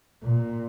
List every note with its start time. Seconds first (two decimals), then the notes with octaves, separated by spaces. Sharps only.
0.22 A#2